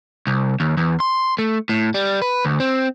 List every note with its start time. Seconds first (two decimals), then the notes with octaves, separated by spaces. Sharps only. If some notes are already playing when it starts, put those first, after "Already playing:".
0.27 C2
0.60 D#2
0.77 E2
1.00 C6
1.39 A3
1.69 A2
1.94 G3
2.22 B4
2.45 D2
2.60 C4